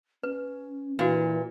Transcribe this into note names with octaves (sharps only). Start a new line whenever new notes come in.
C#4 B4
A#2 E3 D4 F#4 B4